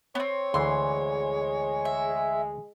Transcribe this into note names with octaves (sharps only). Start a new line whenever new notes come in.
B3 C4 C#5
D2 E3 G#3 C6
E5